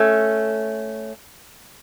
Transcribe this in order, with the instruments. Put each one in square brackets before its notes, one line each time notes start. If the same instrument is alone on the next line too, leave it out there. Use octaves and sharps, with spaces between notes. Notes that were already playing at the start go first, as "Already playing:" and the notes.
Already playing: [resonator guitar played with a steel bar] A3 C#4